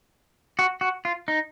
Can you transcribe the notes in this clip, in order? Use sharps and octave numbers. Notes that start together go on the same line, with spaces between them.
F#4
F#4
F4
D#4